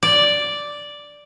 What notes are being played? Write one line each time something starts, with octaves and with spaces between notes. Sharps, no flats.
D5